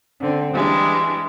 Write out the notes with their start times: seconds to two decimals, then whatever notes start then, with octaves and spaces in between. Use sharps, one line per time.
0.20 D3 C4
0.54 E3 G3 G#3 D4